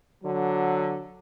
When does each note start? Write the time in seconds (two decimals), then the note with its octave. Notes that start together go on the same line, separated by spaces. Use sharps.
0.24 D3 F#3